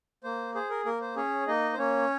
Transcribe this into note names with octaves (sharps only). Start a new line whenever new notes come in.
A#3 C5
G#4 C5
A#4
A#3 A#4
C5
C#4 G#4 C#5
A#3 D#4 D#5
C5
A#3 C#4 C#5